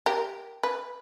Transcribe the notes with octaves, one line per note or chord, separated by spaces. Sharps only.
G4 A#4
B4